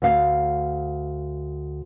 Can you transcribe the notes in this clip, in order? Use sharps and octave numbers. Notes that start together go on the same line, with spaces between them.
D2 F5